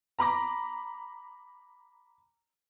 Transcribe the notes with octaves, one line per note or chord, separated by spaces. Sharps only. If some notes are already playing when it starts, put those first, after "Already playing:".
A#5 B5 D6 A#6